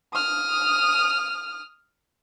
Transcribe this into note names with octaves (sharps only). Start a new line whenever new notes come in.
D#6 F6